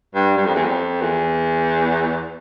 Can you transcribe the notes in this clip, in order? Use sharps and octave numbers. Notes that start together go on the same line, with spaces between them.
G2
G2
F2
E2
F2
E2